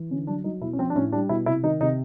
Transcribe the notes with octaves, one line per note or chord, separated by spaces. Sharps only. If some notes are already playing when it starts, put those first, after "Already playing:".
Already playing: E3
D3 C#4
F#3 D4
F#3 D#4
B2 E4
C#4
F3 C4
D4
A2 C#4
G3 D4
B2 E4
C3 E4
D#3 D#4
C3 D#4